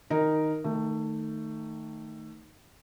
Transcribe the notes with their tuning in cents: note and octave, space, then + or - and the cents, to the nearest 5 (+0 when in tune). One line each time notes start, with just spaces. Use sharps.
D#3 +0 D#4 +0 A#4 +0
D#3 +0 A3 +20